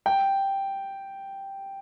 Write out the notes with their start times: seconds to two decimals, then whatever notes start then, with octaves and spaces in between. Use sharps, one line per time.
0.06 G5